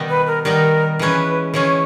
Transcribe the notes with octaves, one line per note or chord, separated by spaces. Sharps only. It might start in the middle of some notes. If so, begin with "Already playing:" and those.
Already playing: B2 D#3 G3 B3 D#4
B4
A#4
D#3 G3 B3 D#4 A#4
E3 G#3 C#4 B4
E3 G#3 C#4 C#5